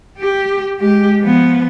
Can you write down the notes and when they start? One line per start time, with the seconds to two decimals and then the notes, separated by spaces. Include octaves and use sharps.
0.18 G4
0.80 G#3 G4
1.21 F3 B3